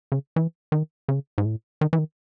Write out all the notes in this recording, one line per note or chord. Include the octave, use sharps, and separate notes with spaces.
C#3
E3
D#3
C#3
G#2
A2
D#3
E3
D#3